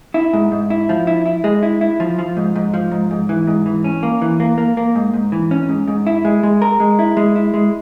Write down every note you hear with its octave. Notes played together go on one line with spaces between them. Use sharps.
E4
G#2
G#2
E4
F3
E4
E4
G#3
E4
E4
F3
F3
G#2
G#2
F3
G#2
G#2
E3
G#2
E3
C#4
A#3
E3
A#3
A#3
A#3
G#2
G#2
E3
C#4
G#2
G#2
E4
G#3
G#3
A#4
G#3
E4
G#3
E4
G#3